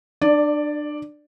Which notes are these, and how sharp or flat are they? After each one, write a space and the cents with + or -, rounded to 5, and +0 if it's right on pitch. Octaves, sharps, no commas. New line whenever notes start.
D4 +30 D5 +0